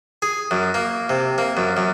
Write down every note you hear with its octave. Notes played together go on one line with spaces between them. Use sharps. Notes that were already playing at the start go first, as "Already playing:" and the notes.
G#4
F#2
A#3
C3
A#3
F#2
F#2